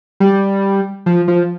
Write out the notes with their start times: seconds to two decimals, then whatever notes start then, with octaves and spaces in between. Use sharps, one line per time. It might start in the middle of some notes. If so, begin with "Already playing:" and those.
0.20 G3
1.06 F3
1.28 F3